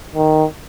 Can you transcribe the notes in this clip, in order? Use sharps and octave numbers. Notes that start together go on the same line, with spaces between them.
D#3